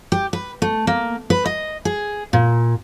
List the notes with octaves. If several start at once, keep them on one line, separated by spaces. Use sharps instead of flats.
G4
B4
A3
A#3
B4
D#5
G#4
A#2